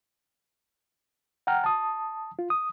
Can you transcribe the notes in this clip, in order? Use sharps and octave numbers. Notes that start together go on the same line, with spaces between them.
F#5 G5 A#5 F6
A5 D#6
F4
D#6